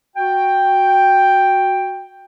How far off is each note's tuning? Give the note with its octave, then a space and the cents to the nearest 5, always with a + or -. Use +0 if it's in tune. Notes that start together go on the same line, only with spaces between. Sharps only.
F#4 -5 G5 +5